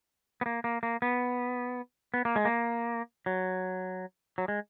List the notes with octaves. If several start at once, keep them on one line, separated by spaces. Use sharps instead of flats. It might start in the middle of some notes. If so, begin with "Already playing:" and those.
B3
A#3
A#3
A#3
B3
B3
A#3
G#3
A#3
F#3
F#3
G#3